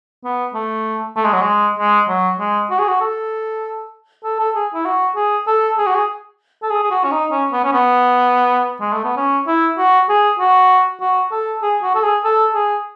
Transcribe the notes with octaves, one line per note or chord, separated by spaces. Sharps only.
B3
A3
A3
G#3
F#3
G#3
G#3
F#3
G#3
F#4
G#4
F#4
A4
A4
A4
G#4
E4
F#4
G#4
A4
G#4
F#4
G#4
A4
G#4
G#4
F#4
C#4
D#4
C#4
B3
C#4
B3
G#3
A3
B3
C#4
E4
F#4
G#4
F#4
F#4
A4
G#4
F#4
A4
G#4
A4
G#4